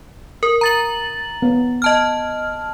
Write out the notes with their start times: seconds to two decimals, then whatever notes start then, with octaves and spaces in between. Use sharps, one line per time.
0.43 A#4
0.61 A#5 A6 F#7
1.42 B3
1.82 D#5 A5 F6